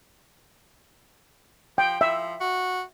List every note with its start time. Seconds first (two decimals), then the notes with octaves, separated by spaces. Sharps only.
1.78 F3 G5
2.01 F3 E5
2.40 F#4